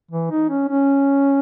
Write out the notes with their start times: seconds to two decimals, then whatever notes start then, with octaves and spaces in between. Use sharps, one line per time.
0.11 E3
0.31 D#4
0.50 C#4
0.68 C#4